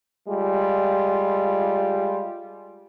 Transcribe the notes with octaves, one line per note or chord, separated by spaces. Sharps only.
G3 G#3 F4